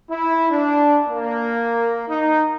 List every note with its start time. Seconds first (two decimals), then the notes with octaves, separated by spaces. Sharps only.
0.10 E4
0.50 D4
1.08 A#3
2.08 D#4